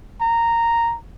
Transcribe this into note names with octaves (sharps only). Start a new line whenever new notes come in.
A#5